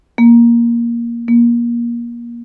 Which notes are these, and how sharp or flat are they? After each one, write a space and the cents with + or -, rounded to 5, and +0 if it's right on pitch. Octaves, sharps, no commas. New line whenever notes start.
A#3 +10
A#3 +25